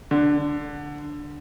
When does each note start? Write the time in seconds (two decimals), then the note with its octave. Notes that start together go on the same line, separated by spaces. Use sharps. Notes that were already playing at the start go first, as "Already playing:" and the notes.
0.11 D3